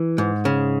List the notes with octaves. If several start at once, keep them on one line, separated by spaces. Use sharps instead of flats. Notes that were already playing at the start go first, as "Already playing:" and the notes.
Already playing: E3
G#2
C#3